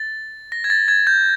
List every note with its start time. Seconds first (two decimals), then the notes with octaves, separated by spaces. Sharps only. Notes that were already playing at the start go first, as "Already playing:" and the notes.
Already playing: A6
0.52 A#6
0.64 G#6
0.70 A6
0.88 G#6
1.07 G6